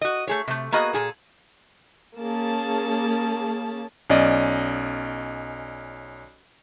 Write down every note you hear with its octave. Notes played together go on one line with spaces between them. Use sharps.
F#4 D#5
A3 G#4 C#5
C3 A3
A#3 B3 F#4 G#4 D#5
A#2 G#4 A4
A#3 C#4 G#4 A5
B1 C#4 D5 D#5